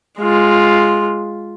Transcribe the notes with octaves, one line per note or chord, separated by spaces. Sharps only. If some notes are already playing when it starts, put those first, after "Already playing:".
G#3 F4